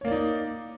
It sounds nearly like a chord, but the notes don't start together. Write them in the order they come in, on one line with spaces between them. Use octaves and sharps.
C#5 A#3 D5 D#4